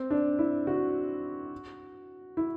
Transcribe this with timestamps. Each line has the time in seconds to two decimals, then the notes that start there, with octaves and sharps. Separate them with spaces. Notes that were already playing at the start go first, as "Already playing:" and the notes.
Already playing: C4
0.10 D4
0.39 E4
0.67 F#4
2.37 E4